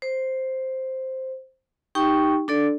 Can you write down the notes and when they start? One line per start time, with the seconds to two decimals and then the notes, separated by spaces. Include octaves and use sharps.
0.02 C5
1.95 D#4 G4 G5 C#6
2.48 D4 A4 D5